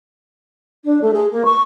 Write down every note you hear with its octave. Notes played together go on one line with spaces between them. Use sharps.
D4
A3
G#4
A#3
C#6